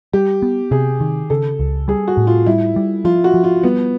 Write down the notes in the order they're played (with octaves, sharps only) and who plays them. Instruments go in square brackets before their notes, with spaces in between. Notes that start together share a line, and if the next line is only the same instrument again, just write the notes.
[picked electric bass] G3 [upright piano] G4
[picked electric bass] B3
[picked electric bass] C3 [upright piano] G#4
[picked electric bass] D#3
[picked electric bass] C#3 [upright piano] A4
[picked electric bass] C#2
[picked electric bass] G3 [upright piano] G#4
[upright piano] F#4
[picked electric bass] A2
[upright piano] F4
[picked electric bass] G3 [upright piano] E4
[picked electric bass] G3
[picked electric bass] F3 [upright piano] F4
[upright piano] F#4
[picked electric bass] F3
[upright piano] F4
[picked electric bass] G3 [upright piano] B3